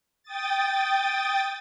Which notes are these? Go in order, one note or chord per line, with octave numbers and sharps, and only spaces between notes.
G5 D#6 A6